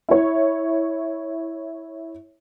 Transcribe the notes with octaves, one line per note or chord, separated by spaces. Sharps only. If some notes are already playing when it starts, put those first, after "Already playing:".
E4 C#5